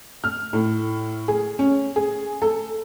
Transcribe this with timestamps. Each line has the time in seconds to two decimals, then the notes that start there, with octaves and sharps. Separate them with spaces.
0.24 F6
0.53 A2
1.28 G#4
1.59 C#4
1.96 G#4
2.42 A4